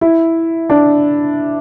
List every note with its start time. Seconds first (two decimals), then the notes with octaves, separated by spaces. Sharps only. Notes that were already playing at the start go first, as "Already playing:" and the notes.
0.01 E4
0.70 D4